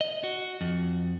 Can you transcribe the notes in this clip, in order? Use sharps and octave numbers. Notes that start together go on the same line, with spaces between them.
D#5
F#4
F2